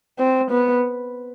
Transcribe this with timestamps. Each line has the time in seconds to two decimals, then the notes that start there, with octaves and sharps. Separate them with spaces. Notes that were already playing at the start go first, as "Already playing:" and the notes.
0.19 C4
0.50 B3